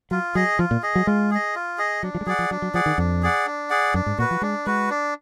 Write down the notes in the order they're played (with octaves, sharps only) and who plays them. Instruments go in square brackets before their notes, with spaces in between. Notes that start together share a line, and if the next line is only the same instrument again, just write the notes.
[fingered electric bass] F#3 [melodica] F4
[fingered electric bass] F#3 [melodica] G#4 D#5
[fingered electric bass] F3 [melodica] F4
[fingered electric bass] A#2
[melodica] G#4 D#5
[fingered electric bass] F#3
[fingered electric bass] G#3 [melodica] F4
[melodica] G#4 D#5
F4
G#4 D#5
[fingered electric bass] F#3 [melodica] D4
[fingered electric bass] F3
G#3
[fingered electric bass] F#3 [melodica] G#4 D5 F#5
[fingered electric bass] F3
[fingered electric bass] F#3 [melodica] D4
[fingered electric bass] F#3
[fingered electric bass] F3 [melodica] G#4 D5 F#5
[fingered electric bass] D#3
[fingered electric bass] F2 [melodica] D4
[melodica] G#4 D5 F#5
D4
G#4 D5 F#5
[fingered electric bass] F#2 [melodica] D4
[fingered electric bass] G#2
[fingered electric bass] A#2 [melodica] F#4 B4
[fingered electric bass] F3
[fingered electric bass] G#3 [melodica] D4
[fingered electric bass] G#3 [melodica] F#4 B4
[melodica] D4